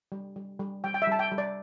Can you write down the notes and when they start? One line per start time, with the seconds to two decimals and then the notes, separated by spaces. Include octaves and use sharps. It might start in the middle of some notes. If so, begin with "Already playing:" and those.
0.12 G3
0.36 G3
0.60 G3
0.84 G3 G5
0.94 G5
1.02 E5
1.07 G3 A5
1.19 G5
1.31 G3
1.38 D5